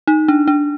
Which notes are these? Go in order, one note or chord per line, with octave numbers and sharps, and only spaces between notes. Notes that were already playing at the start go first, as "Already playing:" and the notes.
D#4
D4
D4